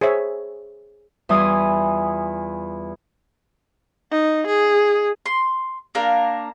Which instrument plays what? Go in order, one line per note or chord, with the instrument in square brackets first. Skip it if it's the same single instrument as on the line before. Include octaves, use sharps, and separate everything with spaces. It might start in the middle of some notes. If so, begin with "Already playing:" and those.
[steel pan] G#4 C5 C#5 E5
[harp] E2 E3 G3 F4 G#5 D#6
[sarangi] D#4
G#4
[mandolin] C6
A#3 D4 A#4